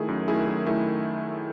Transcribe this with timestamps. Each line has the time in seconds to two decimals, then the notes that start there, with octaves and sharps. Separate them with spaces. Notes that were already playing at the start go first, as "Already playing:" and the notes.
Already playing: D#3 A3 E4 G#4
0.08 F#2
0.28 D#3 A3 E4 G#4
0.47 F#2
0.66 D#3 A3 E4 G#4